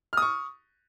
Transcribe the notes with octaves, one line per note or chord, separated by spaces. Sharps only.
C#6 D#6 F6